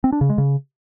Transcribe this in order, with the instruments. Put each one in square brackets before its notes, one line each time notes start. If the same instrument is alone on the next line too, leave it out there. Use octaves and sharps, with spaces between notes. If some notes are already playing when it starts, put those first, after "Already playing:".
[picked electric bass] C4
D4
C#3
G#3
C#3